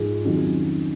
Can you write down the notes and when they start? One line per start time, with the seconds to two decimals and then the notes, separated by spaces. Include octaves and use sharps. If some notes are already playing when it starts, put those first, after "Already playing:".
Already playing: G#2 F3 G#3
0.24 F2 D#3 F#3 C#4 F#4